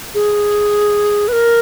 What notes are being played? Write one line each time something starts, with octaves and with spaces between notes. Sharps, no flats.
G#4
B4
A#4